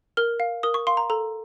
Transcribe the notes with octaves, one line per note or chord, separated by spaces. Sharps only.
A#4 F6
F5
A#4 D#6
C#6
F5 C6
A#5
A4 A#5